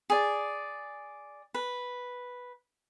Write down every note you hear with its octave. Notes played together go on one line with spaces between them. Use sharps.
G#4 D5
B4